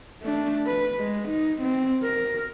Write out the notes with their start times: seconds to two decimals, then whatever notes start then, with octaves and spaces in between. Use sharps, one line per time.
0.23 A3 D4
0.66 B4
0.99 G#3
1.28 D#4
1.61 C4
2.03 A#4